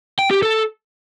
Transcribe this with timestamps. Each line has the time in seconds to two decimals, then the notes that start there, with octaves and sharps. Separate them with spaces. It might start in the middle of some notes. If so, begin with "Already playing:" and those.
0.19 G5
0.31 G4
0.43 A4